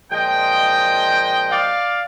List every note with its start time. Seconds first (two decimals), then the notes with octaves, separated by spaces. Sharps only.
0.11 A#2 F3 G#3 D#5 G5
1.51 D5 F5